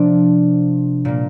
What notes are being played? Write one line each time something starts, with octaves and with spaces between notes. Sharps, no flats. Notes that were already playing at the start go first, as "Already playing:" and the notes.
Already playing: C3 F3 A#3 D4
A#2 G3 A#3